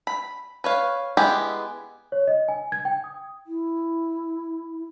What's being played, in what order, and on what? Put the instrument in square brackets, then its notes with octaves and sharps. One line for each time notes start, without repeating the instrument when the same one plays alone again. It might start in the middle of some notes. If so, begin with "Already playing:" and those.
[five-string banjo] B5
B4 C#5 F5
G#3 B3 E4 G4 G#4
[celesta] C#5
D#5
G#5
G#6
G5
D#6
[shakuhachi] E4